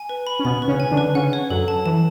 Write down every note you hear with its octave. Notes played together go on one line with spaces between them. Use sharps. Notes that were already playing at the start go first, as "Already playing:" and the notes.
Already playing: G#5
B4
B5
C#4
B2 B3 B5
B4
C#3 C#4
G#5
D3 D4
B4
C#3 C#4 F#5
C#5
F#2 F#3 A4
A5
E3 A5